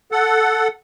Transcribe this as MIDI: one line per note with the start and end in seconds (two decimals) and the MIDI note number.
0.12 0.68 69
0.12 0.68 78